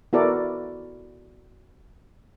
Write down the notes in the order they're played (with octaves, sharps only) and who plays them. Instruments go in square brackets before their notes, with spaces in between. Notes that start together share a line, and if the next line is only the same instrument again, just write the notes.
[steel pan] B3 E4 F#4 A4 A#4 D5